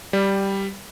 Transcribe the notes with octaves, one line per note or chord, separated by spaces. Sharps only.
G3